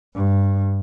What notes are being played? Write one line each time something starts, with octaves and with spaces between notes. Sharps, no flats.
G2